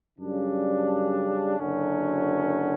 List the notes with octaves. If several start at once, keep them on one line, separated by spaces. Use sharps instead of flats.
F#2 C#3 G3 D4
F#1 F#2 D3 F#3 C#4